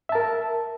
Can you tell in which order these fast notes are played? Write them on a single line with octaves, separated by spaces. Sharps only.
E5 A5 A#4